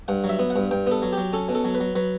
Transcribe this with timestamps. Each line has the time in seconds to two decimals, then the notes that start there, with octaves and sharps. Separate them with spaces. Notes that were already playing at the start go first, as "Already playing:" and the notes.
0.08 G2 F#5
0.24 F#3
0.29 E5
0.39 B3
0.50 F#5
0.56 G2
0.71 G2 G5
0.87 B3 A4
1.02 F#3
1.13 F#3 G4
1.33 C#4 A4
1.49 B2
1.55 A4
1.65 F#3
1.75 B4
1.80 F#3
1.95 F#3 B4